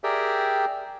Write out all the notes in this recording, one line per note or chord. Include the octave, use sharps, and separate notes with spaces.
G4 G#4 A#4 D5 E5 G5